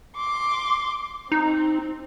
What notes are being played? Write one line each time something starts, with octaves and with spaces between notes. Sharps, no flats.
C6 D6
C4 D#4